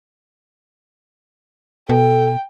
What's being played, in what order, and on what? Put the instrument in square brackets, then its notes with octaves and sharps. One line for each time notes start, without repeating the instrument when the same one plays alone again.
[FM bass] B2 [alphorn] A4 [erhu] G5